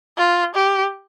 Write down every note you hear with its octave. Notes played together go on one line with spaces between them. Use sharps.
F4
G4